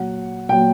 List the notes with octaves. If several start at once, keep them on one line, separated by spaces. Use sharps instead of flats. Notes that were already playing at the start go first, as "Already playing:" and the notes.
Already playing: A#2 F#3 F#5
A#2 F#3 G5